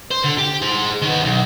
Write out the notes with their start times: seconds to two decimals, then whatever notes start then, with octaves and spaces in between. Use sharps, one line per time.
0.11 C5
0.24 D3
0.38 G4
0.62 G#4 C5
1.02 D#3 B3
1.21 B1 E2